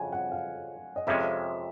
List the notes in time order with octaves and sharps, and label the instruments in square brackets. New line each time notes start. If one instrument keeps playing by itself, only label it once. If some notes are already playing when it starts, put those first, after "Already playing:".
Already playing: [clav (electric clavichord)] F2 C#3 [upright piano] E5 F#5 G#5
[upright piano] F#5
F5
D#5
[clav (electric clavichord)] F2 C3 F3 G#3 C#4 [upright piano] E5